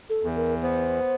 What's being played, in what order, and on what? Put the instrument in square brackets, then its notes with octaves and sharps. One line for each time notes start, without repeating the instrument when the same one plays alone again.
[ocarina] A4
[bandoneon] E2
[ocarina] A#4
[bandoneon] B3 [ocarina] C5